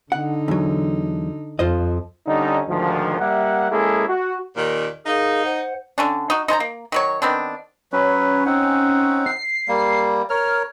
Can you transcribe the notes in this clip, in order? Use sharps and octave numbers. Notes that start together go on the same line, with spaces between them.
D3 D#4 F#5
E2 F#3
F2 F4 C5 D#5
D3 G3 C#4 D#4
D2 G#2 D#3 F3
G3 A#3 E5 F#5
G#3 A#3 C#4 E4 G#4 A4
F#4
D#2 A#2 D#3
D#4 G#4 A#4 F5
C5 F#5
D3 C#4 D4
D#4 F#4
D#4 C5 A5 A#5
A#3
D#3 F#3 C#5
D#3 B3 C4 D4
F#3 C#4 B4
C4 D#4 F#5
C7
G3 A#3
A#4 C#5 F6